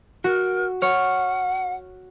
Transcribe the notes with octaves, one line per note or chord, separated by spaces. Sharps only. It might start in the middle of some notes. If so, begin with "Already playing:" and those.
F#4 A#4
C#5 F#5 F6